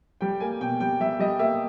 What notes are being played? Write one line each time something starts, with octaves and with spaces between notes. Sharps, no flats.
G3 G5
A#3 G#5
B2 G5
G3 G5
G3 E5
G3 D#5
A#3 E5